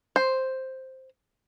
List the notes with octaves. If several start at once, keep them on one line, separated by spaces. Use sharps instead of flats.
C5